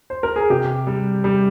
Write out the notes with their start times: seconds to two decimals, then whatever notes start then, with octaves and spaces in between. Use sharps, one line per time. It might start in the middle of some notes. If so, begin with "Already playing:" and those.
0.10 C5
0.23 A#4
0.36 G#4
0.50 C3 G4
0.87 G3
1.24 G3